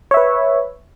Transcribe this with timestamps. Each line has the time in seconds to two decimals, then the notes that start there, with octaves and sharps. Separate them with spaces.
0.11 C#5
0.14 E5
0.17 B4